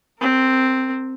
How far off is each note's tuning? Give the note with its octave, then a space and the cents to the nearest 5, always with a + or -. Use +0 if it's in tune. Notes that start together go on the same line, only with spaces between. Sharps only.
C4 +0 A#4 -35